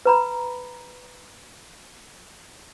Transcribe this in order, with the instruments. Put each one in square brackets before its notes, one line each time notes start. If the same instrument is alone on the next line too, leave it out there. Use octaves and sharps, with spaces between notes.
[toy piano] B4 A#5 B5